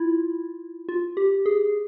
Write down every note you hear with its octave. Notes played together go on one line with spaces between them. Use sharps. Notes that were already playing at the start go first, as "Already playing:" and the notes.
Already playing: E4 F4
F4
G4
G#4